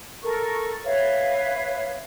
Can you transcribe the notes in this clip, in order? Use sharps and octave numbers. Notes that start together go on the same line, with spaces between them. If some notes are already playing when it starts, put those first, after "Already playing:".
A4 A#4 C#6
B4 C#5 E5 F5